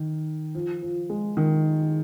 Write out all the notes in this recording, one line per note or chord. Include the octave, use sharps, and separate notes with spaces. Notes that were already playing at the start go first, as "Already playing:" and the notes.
Already playing: D#3
F3
F3
G#3
D#3